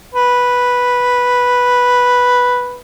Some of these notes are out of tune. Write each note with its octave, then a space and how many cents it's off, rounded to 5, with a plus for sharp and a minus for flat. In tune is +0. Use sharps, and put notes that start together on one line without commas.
B4 -5